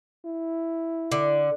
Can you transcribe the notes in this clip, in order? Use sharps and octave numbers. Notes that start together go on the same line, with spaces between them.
E4
D3